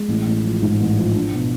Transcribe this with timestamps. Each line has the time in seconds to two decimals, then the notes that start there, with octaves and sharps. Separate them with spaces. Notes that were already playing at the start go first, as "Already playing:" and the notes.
Already playing: G#3
0.08 A1
0.26 A1
0.44 F3
0.62 G#2
0.79 A1
0.97 F3
1.15 D4
1.32 B2